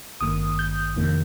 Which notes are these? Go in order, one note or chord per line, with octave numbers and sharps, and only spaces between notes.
G#1 G2 D#3 A#3 D#6
G6
F2 C3 D#3 A#3